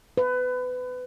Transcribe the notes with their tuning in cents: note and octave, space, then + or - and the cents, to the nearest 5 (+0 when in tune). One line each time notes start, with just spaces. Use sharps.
B4 +25